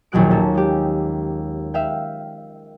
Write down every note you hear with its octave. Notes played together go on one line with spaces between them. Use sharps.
A#1 D#2 B2 F#3 F#6 D7
A#3 C#4 F#4 A4
G#3 G4
E5 F5 G5